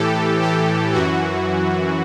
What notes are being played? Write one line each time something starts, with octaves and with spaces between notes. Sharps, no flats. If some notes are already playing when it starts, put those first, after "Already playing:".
Already playing: A2 E3 G4 A4
G4
F#2 E3 F#4